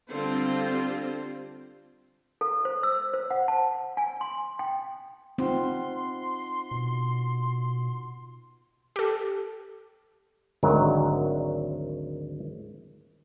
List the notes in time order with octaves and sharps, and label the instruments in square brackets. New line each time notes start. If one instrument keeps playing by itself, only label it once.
[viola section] D3 G3 C4 F4 C5
[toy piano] A4
C5
E6
C5
F#5
A5
G#5
C6
G5
[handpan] C4 [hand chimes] D#4 F4 F#5 [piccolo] C6
[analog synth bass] B2
[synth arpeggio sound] G4 A4
[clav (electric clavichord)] G#1 D2 D#3 F#3 A#4